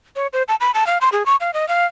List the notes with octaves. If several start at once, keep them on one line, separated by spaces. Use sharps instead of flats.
C#5
C5
A5
B5
A5
F5
C6
G#4
C#6
F5
D#5
F5